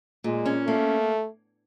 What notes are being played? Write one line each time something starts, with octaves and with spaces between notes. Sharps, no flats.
A#2 G#3
C#4
A3 A#3